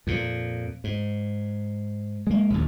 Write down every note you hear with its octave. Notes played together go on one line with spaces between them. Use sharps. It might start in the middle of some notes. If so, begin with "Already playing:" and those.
F2 A#2
G#2
G#3 A#3
A#1 D#2